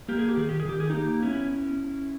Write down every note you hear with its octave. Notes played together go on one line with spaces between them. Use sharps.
A#3 G4
G#4
G4
D#3 G#4
G4
G#4
D#3 G4
G#4
A#3 D#4 G4
B3 C#4 E4